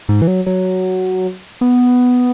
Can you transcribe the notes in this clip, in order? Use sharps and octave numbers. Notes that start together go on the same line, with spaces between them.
G#2
E3
F#3
F#3
B3